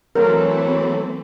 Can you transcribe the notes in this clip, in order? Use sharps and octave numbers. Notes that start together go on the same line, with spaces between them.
E3 F#3 A3 C4 A4 A#4